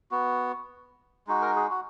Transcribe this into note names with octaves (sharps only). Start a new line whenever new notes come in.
B3 F#4
G#3 D#4 F#4
A#4
G#4
F#4